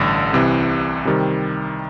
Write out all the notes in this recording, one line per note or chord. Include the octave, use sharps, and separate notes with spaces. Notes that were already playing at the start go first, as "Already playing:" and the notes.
Already playing: A1 G2 D3
C2 C3 E3
C3 D#3 G3 C4